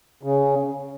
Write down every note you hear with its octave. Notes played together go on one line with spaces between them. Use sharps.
C#3